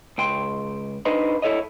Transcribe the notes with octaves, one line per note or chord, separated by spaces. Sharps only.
C#2 G5 C6
D4 D#4 B4 C5 D#5 B5
E4 A4 C#5 D#5